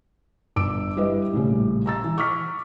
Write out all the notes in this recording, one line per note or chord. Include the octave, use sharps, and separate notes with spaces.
G1 D6 E6 D7
G3 E4 G4 B4 D#5
A#1 A2 C#3 G3
A#5 E6 A6
E3
C#6 D6 F6 B6